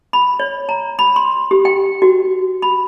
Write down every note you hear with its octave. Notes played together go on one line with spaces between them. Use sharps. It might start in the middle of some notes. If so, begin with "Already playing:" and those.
B5
C#5
A#5
B5
C6
G4
G5
F#4
B5